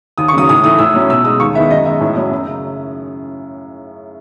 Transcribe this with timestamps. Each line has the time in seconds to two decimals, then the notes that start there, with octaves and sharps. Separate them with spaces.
0.18 D#2 D#6
0.28 C#6
0.33 C#3 F#3 D#6
0.49 A2 D#6
0.64 E3 A3 E4 D#6
0.78 A2 E6
0.94 F#3 C#4 E4
1.10 B2 E6
1.25 G#3 D#4 D#6
1.40 D#2 C#6
1.55 D#3 G#3 B3 E4 E5
1.70 F#2 D#5
1.86 D#3 G#3 E5
2.00 A2
2.16 F#3 C#4 E4
2.31 F#2
2.47 C#3